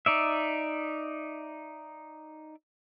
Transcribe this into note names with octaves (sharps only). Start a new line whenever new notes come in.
D#4 D5 E5